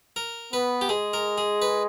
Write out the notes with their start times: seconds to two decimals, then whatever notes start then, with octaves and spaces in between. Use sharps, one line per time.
0.16 A#4
0.53 B3 B4
0.81 G4
0.89 G#3 G#4
1.13 A#4
1.38 G#4
1.62 B4